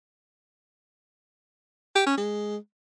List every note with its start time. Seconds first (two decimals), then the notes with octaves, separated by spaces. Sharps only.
1.95 G4
2.06 C#4
2.17 G#3